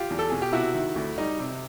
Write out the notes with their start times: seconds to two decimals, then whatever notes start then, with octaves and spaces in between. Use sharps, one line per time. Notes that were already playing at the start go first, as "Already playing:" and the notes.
Already playing: F4 G4
0.10 E2
0.19 A4
0.30 B2 G#4
0.42 G4
0.53 C3 E4 F#4
0.74 D#3
0.96 D2
1.18 G3 D#4
1.39 C3